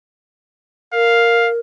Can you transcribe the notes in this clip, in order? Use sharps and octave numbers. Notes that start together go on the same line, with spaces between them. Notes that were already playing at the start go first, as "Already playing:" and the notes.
A#4 F5